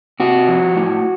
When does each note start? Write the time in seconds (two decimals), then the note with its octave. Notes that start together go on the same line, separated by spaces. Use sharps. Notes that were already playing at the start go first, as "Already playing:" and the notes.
0.20 C3 F#4
0.48 F3
0.76 A2